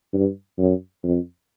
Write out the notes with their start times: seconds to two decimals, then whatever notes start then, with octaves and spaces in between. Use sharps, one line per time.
0.14 G2
0.59 F#2
1.04 F2